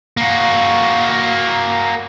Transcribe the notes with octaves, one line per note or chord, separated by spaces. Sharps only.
A#3 F#4